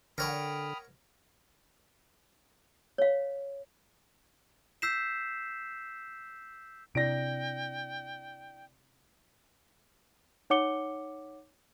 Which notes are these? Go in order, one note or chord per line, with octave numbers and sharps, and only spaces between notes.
D3 A#4 C#5 F#5 G5 B5 D#6 F6
C#5 F5
E6 G6 B6 C7 E7
C3 D4 E4 D5 G5 A#6 D7
D#4 C#5 F#5 D6 C#7 G7